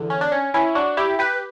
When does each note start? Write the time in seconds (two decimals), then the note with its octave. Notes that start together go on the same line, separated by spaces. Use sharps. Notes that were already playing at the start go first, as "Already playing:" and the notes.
Already playing: E2 D3
0.10 C#4
0.21 D4
0.32 C#4
0.54 C#4 E4
0.75 D4 F#4
0.97 E4 G4
1.19 G4 B4